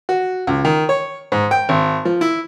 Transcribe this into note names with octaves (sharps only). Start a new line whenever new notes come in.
F#4
C#2
D#3
C#5
G#2
G5
G#1
F3
E4